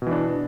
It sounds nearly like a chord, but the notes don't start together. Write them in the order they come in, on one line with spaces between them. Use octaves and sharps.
B2 E3 D4